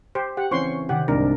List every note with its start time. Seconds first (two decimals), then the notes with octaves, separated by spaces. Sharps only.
0.15 G4 C5
0.37 G4 F#5
0.51 C#3 E3 C4 C#4 C5 C6 C#6
0.89 C3 D#3 G4 F#5
1.08 C2 G#2 D4 A#4